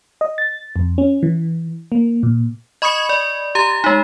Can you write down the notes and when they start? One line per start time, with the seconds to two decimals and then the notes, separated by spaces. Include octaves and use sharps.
0.21 D#5
0.38 A6
0.76 F2
0.98 C#4
1.23 E3
1.92 A#3
2.23 A#2
2.82 D#5 B5 C#6 D#6 G#6 C#7
3.09 D5
3.55 G4 A#5 A6
3.84 G#3 D#4